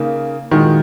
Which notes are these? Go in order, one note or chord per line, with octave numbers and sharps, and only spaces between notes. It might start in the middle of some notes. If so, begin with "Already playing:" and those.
Already playing: C#3 A#3 D#4
A#2 D#3 G#3 F#4